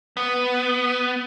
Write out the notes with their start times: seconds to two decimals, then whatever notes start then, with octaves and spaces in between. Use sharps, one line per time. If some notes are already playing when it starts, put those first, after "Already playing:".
0.17 B3